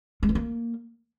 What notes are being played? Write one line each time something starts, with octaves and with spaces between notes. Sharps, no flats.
G#3
E3
A#3